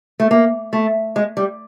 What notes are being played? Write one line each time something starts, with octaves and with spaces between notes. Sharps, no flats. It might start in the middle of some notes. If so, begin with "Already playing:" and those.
A3
A#3
A3
G#3
G3